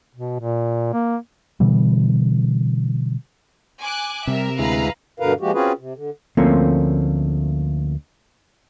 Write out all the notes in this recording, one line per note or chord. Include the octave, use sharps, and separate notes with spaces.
B2
A#2
A#3
B2 D3 E3 G3
G#5 D6 F#6
C3 G3 A#4 E5
D2 G#3 E4 B4 F5 A#5
G2 B2 D3 A#4 B4 F5
F3 G#3 A#3 F#4 G4
C4 C#4 F4 F#4 G#4 B4
C3
D3
D2 F3 A3 A#3 C4 C#4